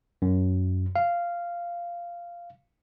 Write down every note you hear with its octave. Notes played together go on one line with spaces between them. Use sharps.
F#2
F5